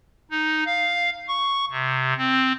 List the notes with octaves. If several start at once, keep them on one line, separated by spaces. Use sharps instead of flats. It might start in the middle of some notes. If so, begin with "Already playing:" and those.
D#4
F5
C#6
C3
C4